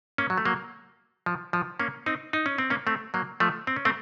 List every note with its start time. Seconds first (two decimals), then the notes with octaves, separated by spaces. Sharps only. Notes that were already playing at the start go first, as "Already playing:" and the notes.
0.18 A#3 C#4
0.30 F#3
0.38 A3
0.45 F#3 A#3
1.26 F3
1.53 F3
1.79 A#3 C#4
2.06 C4 D#4
2.33 D#4
2.46 C#4
2.58 C4
2.70 A#3 C#4
2.87 A3 C4
3.14 F#3 A#3
3.40 F3 A3
3.67 C4
3.76 C#4
3.85 A3 C4